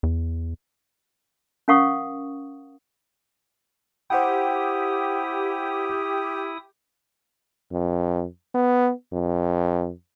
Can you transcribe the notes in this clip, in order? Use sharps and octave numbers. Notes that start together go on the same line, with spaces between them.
E2
C#4 A#4 F5 F#5 C#6 D#6
E4 G4 C5 F#5 G5 D#6
F2
B3
F2